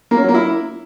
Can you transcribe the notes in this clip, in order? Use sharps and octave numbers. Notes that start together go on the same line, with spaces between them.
A#3
C#4
F#3
A#3
E4